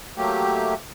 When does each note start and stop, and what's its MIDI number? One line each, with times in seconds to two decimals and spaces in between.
0.17 0.74 54
0.17 0.74 57
0.17 0.74 58
0.17 0.74 67